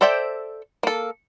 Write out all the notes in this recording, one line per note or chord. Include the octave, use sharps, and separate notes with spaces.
A4 C5 D5 E5 G5
A#3 A4